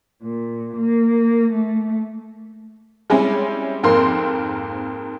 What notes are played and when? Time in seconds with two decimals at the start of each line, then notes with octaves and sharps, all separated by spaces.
0.22 A#2
0.76 A#3
1.51 A3
3.10 G3 G#3 C4 C#4 E4
3.83 F2 G#2 A#3 C4 A#4 C6